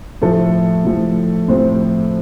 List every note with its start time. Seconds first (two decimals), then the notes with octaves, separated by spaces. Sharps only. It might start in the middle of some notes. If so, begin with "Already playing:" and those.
0.22 A2 F3 A3 A4
0.85 A2 F3
1.48 A2 F3 C4 C5